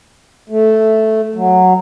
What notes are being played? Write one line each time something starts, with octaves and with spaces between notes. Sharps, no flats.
A3
F#3